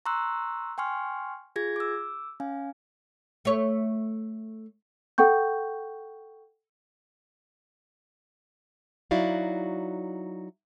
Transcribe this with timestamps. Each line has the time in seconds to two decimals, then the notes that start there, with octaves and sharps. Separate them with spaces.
0.06 A#5 C6 C#6 E6 F#6
0.78 G5 G#5 C6 C#6 F6
1.56 F4 G#4 G#6 A#6
1.76 D6 E6
2.40 C#4 F5 G#5
3.45 A3 C#5
5.18 A4 F#5 G5 C#6 G6
9.11 F#3 D#4 E4 F#4 D5 F5